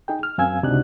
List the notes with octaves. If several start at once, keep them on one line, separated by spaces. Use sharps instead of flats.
D#4 G#4 G5
F6
F#2 C4 F5 G#5 E6 G#6
C#2 C3 D4 D#4 F#4 F#6